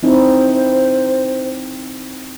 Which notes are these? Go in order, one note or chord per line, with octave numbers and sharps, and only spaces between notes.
C4 D#4 E4 C5